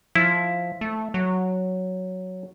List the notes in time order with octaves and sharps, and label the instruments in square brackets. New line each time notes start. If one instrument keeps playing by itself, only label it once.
[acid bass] F3 [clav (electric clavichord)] E4
[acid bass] A3
F#3